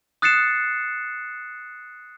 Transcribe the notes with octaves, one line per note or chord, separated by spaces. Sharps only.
D#6 F#6 A6 C7 C#7 E7